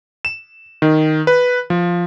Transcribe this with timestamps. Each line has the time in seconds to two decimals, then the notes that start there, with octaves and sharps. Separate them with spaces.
0.25 E7
0.82 D#3
1.27 B4
1.70 F3